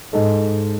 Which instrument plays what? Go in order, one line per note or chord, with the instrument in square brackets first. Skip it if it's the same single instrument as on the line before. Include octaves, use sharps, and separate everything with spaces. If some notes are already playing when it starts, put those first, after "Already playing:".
[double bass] G#2 [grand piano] G#3 D#4 A4